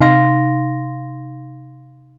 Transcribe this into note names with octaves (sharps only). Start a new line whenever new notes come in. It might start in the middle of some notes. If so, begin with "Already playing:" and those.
C3 D#4 F5 C6 A#6